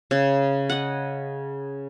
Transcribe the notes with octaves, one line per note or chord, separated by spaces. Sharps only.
C#3
D#5 F#5